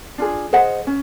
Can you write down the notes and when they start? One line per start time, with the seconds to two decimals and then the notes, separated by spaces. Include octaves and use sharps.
0.18 D4 F4 G#4
0.53 G#4 C5 D#5 F#5
0.87 C#4